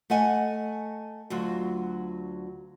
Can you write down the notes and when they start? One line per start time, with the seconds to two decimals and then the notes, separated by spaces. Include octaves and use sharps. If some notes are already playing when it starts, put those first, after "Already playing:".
0.10 A3 D#5 F#5 G#5
1.30 D2 F#3 F4 F#4